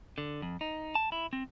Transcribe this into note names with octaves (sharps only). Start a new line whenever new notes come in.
D3
F2
D#4
A5
E4
C4